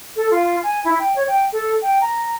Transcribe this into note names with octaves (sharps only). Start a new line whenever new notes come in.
A4
F4
G#5
E4
G5
C#5
G5
A4
G5
A#5